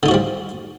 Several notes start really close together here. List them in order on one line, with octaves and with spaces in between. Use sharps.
D3 D#4 F#4 F3 G3